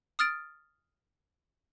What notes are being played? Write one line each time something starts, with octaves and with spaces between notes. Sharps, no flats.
D#6 F6 A6 D7